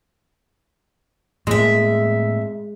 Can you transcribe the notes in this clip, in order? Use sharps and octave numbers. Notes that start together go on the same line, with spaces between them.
F2 A2 G#3 A#3 E5